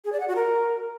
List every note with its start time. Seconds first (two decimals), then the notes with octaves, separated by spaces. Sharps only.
0.05 G#4
0.12 D5
0.20 F#5
0.28 F#4
0.36 A#4